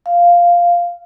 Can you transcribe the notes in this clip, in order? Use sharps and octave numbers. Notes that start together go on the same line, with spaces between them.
F5